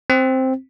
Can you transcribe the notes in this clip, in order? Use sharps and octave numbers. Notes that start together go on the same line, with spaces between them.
C4